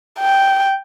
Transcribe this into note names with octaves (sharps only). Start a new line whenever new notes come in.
G5